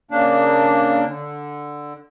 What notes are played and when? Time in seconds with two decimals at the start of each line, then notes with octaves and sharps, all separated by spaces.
0.11 C#3 A#3 D4
1.08 D3